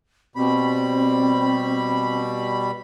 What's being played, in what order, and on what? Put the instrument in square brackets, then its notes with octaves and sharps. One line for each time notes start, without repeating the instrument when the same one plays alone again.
[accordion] B2 G3 B5 [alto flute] C4